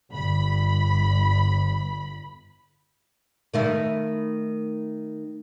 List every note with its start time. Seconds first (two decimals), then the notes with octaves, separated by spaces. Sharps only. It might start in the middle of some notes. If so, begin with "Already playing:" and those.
0.10 G1 B5
3.54 D#3 A3 E4